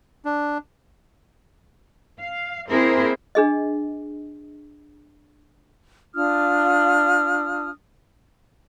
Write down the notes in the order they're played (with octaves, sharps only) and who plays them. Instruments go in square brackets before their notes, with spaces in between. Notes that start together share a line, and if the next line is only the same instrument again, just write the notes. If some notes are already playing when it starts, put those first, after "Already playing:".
[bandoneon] D4
[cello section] F5
A#3 C4 E4 G#4 A#4 C5
[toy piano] D4 G#4 D#5
[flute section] D4 F4 D#6 F6